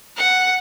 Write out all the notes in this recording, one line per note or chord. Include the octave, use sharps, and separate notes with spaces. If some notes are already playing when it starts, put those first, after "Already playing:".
F#5